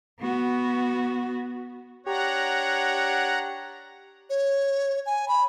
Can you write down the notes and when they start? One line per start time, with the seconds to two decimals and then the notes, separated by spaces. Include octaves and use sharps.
0.20 B3 F#4
2.07 D4 G4 C#5 F#5 A#5
4.30 C#5
5.06 G#5
5.28 B5